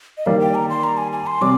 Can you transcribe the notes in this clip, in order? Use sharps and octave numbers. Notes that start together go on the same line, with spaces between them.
D#5
D#3 G3 A#3 F5
G5
A#5
C6
A#5
G#5
G#5
C6
C3 G3 D6